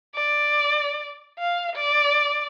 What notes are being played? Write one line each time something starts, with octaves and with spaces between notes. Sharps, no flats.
D5
F5
D5